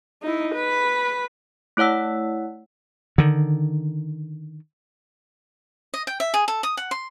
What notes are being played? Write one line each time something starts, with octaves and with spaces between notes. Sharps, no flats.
D#4 E4
B4 B5
A3 E4 C#5 F#5 E6
D3 D#3
D#5
G5
E5
G#4
A4
D#6
F#5
C6